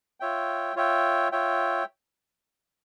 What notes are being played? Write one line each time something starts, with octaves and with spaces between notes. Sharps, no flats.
F4 C#5 E5 G5
F4 C#5 E5 G5
F4 C#5 E5 G5